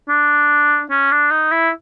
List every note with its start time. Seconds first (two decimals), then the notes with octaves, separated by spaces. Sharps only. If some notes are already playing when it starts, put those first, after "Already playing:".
0.09 D4
0.90 C#4
1.11 D4
1.31 D#4
1.51 E4